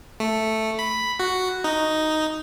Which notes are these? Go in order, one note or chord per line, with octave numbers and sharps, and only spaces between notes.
A3
B5
F#4
D#4